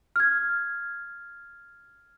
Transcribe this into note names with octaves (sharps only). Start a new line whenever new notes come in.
F6 G#6